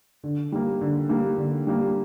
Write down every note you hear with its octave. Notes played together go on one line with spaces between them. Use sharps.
D3
G3 A#3
D3
G3 A#3
D3
G3 A#3